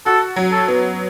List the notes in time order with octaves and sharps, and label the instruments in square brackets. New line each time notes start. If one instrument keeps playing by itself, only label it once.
[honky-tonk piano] F#4 [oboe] A4
[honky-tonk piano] F#3
[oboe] A4
[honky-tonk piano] B3